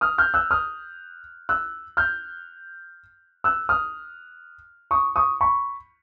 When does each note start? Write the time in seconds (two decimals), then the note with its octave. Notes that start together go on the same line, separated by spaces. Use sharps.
0.01 D#6 F6
0.18 F6 G6
0.34 E6 F#6
0.51 D#6 F6
1.49 E6 F#6
1.97 F6 G6
3.44 E6 F#6
3.69 D#6 F6
4.91 C#6 D#6
5.16 C#6 D#6
5.41 B5 C#6